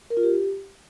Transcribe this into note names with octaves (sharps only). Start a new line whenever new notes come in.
A#4
F4
G4